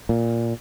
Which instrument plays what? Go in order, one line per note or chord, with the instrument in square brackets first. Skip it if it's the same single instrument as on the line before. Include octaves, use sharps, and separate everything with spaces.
[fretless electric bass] A#2